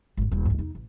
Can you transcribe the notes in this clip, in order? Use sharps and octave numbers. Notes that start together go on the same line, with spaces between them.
G#1 F2
D#1
D2 G2
E2 D#4
A1